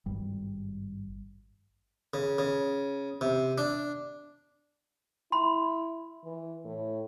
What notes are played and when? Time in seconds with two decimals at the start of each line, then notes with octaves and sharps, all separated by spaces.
0.06 G#1 G2 G3
2.14 C#3
2.39 C#3
3.21 C3
3.58 D4
5.32 E4 B5 C6
6.24 E3
6.65 A2